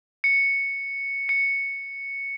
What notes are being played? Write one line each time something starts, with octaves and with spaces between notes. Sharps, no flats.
C#7
C#7